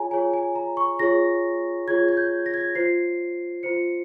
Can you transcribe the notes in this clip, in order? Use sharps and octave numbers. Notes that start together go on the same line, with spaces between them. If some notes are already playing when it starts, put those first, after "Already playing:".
Already playing: F4 G#4 C#5 G#5 A#5
F4 G#4 C#5 G#5
G#5
A#5
C#6
F4 G#4 C#5 A#6
F4 G#4 C#5 G#6
G#6
G6
A#6
G#6
A#6
F4 C5 C7
F4 C5 C#7